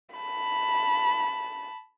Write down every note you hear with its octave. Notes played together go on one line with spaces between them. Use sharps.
A5 B5